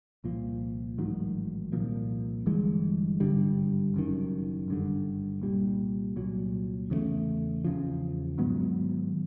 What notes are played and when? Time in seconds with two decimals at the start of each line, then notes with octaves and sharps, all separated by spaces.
0.24 C2 A#2 F3
0.98 A1 G#2 D#3 F#3
1.72 C2 A#2 F3 A#3
2.46 G1 G2 E3 G#3
3.20 G#1 G2 D3 G3
3.94 F#1 F#2 D#3
4.68 G1 G2 D3
5.42 C2 A#2 G3
6.16 C2 A#2 F#3
6.90 E2 C#3 E3 A3
7.64 E2 C#3 F3
8.38 G#2 D#3 F#3 B3